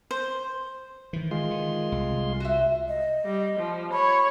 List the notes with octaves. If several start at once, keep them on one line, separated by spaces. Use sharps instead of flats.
C5
D#3 E3
G#3 F4 C6
D#3
C2
F#4 E5
D#5
G3
F3
C#5 B5